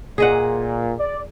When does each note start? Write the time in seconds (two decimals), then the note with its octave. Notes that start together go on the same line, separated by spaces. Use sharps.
0.18 A#2 G#4 D#5 F#5
0.99 D5